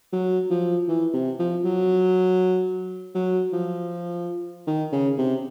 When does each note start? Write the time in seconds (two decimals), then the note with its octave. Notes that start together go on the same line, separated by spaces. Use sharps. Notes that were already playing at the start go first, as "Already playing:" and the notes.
0.12 F#3
0.50 F3
0.88 E3
1.13 C3
1.39 F3
1.64 F#3
3.15 F#3
3.53 F3
4.67 D#3
4.92 C#3
5.18 C3